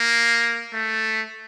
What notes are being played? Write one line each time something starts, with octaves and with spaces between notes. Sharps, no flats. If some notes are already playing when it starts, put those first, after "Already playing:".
Already playing: A#3
A3